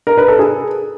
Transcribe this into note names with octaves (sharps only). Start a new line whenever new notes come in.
A#4
B4
A4
G#4